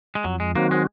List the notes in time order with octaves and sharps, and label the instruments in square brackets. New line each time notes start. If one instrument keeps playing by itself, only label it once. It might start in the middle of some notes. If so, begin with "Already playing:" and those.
[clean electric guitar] G#3
[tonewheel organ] F2 [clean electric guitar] F#3
[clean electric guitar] G#3
[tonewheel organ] D#3 F#3 C4 F#4 [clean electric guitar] A#3
[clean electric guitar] G#3